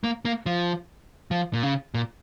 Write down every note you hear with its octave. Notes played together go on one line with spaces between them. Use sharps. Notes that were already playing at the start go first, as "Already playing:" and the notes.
A#3
A#3
F3
F3
A#2
C#3
A#2